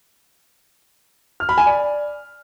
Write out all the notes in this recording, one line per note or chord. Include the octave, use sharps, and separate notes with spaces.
F6
B5
G#5
D5